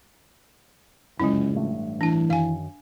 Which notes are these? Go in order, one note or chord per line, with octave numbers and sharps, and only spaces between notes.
G1 C#2 F#2 G#3 C#4 E4
A1 G2 A3
E3 D4 A5
F#2 D#3 F5 G#5